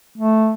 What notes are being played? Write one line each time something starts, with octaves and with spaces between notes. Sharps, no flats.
A3